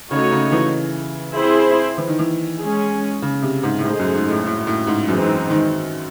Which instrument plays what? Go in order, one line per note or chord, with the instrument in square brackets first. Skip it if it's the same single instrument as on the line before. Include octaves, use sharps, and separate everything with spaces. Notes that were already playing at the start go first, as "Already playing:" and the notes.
[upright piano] C#3 [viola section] A3 D#4 F#4 C#5
[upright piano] C#3
E3
[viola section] C4 E4 G#4 C5
[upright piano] E3
D#3
E3
[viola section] G#3 C#4 G#4
[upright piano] C#3
C3
G#2
A2
[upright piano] G#2 [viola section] A3 D#4 G#4 C5
[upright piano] F#2
G#2
A2
A2
A2
G#2
[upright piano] F#2 [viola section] E3 G#3 C4 D#4
[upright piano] D#3